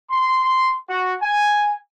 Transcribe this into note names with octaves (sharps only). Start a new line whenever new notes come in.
C6
F#4
G#5